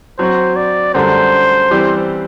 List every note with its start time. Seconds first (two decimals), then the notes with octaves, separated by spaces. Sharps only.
0.19 F#3 C4 F#4 C5
0.56 D5
0.95 F#2 D3 G3 D4 C5
1.71 E3 G3 C4 G4